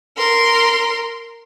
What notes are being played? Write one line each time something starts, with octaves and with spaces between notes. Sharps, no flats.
A#4 C6